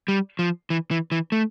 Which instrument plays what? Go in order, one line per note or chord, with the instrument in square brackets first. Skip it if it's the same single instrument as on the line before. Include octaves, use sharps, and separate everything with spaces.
[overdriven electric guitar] G3
F3
E3
E3
E3
A3